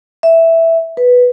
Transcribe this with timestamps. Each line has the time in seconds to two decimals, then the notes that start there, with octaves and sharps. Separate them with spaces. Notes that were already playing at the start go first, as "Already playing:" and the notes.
0.23 E5
0.97 B4